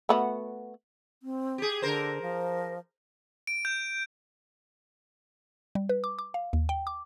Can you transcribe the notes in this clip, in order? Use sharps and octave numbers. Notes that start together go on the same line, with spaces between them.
A3 B3 F#4
C4
G4 G#4
D3 A#4 C5
F3
D7
G6
G3
B4
D6
D6
F5
D#2
G5
D6